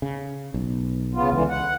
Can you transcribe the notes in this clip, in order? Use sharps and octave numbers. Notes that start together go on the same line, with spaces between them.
C#3
B1
C#3 B3 F4
C#2 D3 E3
F#5